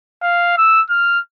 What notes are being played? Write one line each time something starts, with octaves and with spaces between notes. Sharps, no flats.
F5
E6
F6